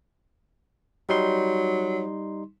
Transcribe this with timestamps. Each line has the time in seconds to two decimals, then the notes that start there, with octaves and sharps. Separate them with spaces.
1.09 F#3 G3 D#4 C6